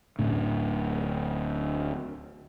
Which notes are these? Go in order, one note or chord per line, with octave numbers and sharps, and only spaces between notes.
D1 D2 A2 C#4